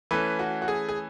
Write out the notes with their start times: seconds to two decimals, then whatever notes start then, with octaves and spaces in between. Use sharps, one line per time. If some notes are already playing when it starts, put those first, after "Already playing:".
0.11 E3 A3 C#4 B4
0.39 F#4
0.62 F#4
0.68 G#4
0.89 G#4